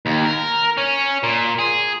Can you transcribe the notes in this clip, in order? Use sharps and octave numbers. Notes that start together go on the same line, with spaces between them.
D#2
A#4
C#4
A#2
G#4